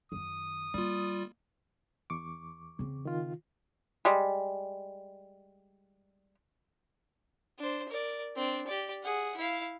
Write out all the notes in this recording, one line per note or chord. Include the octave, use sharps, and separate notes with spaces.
F#2 D#3 D#6
G3 A#3 F4
E2 C#6 D6
C#3 C4
D#3 F4
G3 G#3
D4 C5
A#4 D5
C4 D4
G4 D5
G#4 F#5
E4 F5